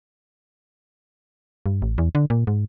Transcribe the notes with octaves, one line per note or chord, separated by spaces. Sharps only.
G2
A1
E2
D3
A#2
G#2